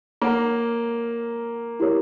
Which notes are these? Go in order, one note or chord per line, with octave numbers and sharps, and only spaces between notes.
A#3 C#5 F#5 A#5
E4 G4 A#4 C#5